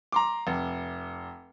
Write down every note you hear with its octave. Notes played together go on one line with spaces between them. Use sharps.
A#5 C6 D6
F1